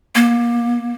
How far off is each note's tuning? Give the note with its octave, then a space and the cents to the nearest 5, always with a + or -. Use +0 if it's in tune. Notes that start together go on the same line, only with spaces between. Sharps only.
A#3 +30